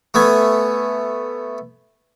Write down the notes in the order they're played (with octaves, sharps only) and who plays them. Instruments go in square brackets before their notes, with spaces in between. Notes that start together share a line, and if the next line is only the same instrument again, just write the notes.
[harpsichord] A3 B3 G#5